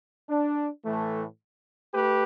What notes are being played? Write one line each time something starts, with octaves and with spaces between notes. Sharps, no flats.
D4
A2 E3 A3
A3 G4 B4